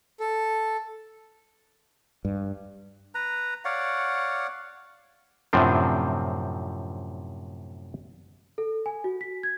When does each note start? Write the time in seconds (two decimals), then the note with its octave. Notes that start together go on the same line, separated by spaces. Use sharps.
0.20 A4
2.25 G2
3.15 B4 A#5
3.65 C#5 D5 F5 F#5
5.53 F#2 A2 C3 F3 C4 D4
8.58 A4
8.86 G#5
9.04 F#4
9.21 B6
9.43 G#6